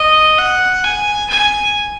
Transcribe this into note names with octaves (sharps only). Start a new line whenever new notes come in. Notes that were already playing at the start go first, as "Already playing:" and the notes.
Already playing: D#5
F#5
G#5
G#5